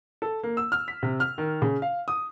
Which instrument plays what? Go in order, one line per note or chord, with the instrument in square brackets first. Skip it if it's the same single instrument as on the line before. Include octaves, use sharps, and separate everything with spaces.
[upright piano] A4
A#3
E6
F6
B6
C3
F6
D#3
C#3
F5
D#6